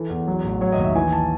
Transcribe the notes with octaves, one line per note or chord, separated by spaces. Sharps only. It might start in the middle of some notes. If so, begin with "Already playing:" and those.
Already playing: E3 A4
E2
F#3
A1
F#3 C#5
D#5
D#2
E5
E3 G#5
A5